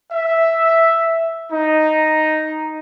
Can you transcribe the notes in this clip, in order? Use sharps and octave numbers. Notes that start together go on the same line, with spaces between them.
E5
D#4